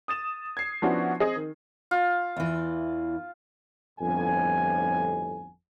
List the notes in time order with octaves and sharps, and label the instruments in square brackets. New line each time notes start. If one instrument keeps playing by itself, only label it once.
[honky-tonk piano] D#6 A6 E7
G#6 C7
F3 B3 C#4 D4 E4 F#4
C4 G#4 D#5
D#3
[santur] F4
[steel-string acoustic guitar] E2 E3
[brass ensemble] G1 F2 A2 G#5